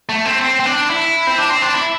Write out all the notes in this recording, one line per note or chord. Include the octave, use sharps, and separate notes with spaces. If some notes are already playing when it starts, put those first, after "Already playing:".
A3
C4
C4
C4
D4
E4
C4
D4
C4
D4
E4